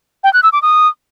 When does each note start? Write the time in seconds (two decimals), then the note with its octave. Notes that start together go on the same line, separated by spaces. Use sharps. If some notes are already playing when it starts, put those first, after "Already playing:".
0.24 G5
0.33 F#6
0.43 E6
0.53 D6
0.62 D#6